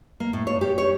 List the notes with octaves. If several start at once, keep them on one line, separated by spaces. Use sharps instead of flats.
A#3
A2
C#5
G4
C#5